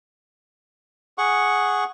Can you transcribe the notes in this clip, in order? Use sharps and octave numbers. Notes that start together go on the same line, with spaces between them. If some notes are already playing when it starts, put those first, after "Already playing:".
G#4 F#5 C#6